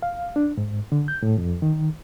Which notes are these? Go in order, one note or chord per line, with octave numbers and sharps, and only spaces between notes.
F5
D4
G#2
D3
G6
A2
F2
D#3